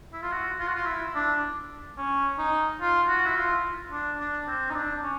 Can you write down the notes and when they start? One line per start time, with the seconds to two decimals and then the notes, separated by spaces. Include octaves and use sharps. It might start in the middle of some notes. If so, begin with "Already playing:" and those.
0.13 E4
0.23 F4
0.32 F#4
0.60 F4
0.68 F#4
0.75 F4
0.86 E4
1.15 D4
1.98 C#4
2.39 D#4
2.81 F4
3.08 F#4
3.26 E4
3.36 F4
3.91 D4
4.20 D4
4.48 C4
4.70 D#4
4.75 D4
5.03 C#4